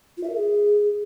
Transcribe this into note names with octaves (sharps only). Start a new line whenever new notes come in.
F4
E5
A#4
G#4